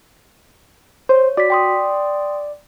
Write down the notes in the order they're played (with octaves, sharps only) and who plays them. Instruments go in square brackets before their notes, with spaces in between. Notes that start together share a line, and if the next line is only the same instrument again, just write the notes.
[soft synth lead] C5 [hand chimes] C#5
[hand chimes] F#4 B6 [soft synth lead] D5
[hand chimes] G5 C6 D#6